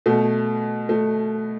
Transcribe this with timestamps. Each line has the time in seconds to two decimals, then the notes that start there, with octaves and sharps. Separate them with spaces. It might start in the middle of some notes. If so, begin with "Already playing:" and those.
0.06 B2 A3
0.89 A3